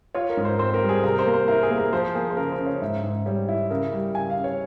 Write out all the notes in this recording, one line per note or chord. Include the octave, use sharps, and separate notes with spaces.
F4 C#5
A#4
G#2
C5
C4 C5
A#4
G3
G#4
C3 A#4
C5
A#3
C5
E4 A#4
G#4
A#3
A#4
F3 C5
A#3 G#4
C5
C#3 A#4
C5
C#3
C#5
G#2 E5
G#2
G3 C#5
E4
C#3 A#4
G3
C#3 G#5
F5
C#3
C#5